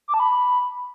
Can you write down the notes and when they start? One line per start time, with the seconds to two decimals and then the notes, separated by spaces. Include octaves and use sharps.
0.08 D6
0.14 A5
0.20 B5